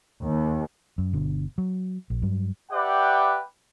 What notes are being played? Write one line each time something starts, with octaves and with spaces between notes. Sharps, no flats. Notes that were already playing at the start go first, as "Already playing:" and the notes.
D#2
F#2
G1 B2 D3
F#3
A#1
G2 F#3
G4 B4 D5 E5 F#5 G5